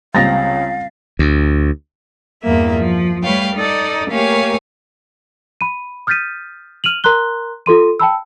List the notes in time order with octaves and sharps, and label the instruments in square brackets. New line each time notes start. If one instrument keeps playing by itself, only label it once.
[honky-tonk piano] C#2 C#3 [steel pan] G3 C4 A#5 [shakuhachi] F5 [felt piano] A6 A#6
[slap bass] D2
[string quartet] E2 G2 E3 A#3 E5
F3
G3 A3 B4 C#5 F5 G5
D#4 A4 D5
A3 A#3 G4 C#5 F5 G#5
[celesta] B5 D#7
D#6 F6 G6 A6 B6 D#7
F6 D#7 F7 F#7
A#4 A#5 C6 F#6 G7
F4 A4 C6 D#7
G5 A5 B5 E6